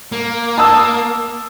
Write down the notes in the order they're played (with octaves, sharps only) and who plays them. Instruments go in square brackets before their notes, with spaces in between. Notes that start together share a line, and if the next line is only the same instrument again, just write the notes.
[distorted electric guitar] A#3
[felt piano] A5 D#6 E6